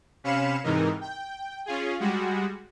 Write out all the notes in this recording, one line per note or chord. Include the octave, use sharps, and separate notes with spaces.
C3 C#4 F5 B5 C#7 E7
G#2 C3 E3 D#4 A#4
G5
C#4 F4 G#4
G3 G#3 F#4